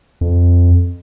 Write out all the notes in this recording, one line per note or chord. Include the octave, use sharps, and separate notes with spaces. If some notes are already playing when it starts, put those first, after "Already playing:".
F2